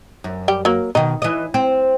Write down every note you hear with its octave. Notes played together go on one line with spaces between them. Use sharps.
F#2
G3 G4
F#3 A#3
B2 D#3 D#4
E3 D#5
C4